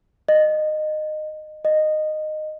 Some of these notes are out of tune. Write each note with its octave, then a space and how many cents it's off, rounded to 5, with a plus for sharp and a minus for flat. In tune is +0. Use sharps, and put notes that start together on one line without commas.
D#5 -20
D#5 -15